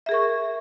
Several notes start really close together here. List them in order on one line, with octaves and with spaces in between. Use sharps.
E5 G#4 A#4 C#6